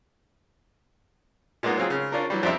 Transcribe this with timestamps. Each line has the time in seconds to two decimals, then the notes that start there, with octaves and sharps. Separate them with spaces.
1.63 A#2 G#3 A#3 B3 D#4
1.77 F#3 C4 F4 G#4
1.90 C#3
2.12 C#4 D4 F4 A#4
2.30 E3 F#3 G3
2.43 F2 C4 D4 G4 E5